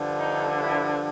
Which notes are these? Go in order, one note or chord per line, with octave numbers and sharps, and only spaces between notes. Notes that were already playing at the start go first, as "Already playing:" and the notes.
Already playing: G2 D3 F3
D#4
E4